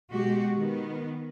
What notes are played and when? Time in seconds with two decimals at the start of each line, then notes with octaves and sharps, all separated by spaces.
0.11 B2 G#3 F#4 G4
0.56 D#3 B3